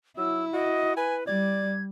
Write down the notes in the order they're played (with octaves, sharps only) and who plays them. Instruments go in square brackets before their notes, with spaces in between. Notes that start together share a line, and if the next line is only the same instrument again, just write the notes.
[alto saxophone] F#3 [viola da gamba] E4 [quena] E6
[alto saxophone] F#4 [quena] D#5
[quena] B4 [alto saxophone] G#5
[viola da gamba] G3 [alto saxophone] D5 [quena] G#6